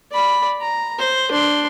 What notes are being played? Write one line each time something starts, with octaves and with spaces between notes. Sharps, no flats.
D5 B5
A#5
C5
D4 C6